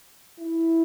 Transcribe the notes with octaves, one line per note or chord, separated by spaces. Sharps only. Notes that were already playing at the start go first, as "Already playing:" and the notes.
E4